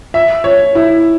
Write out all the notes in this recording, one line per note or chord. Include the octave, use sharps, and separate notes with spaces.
E5
C#5
E4